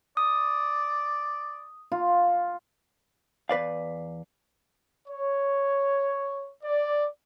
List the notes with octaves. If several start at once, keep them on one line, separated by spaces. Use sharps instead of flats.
D5 D#6
F4
E2 B4 D5 F5
C#5
D5